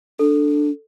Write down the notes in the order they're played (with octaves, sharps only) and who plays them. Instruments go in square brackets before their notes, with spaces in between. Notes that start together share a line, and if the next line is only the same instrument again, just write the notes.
[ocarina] D4 [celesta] A4